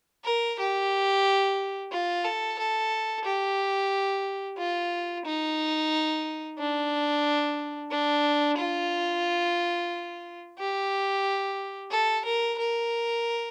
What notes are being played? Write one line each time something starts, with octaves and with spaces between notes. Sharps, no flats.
A#4
G4
F4
A4
A4
G4
F4
D#4
D4
D4
F4
G4
A4
A#4
A#4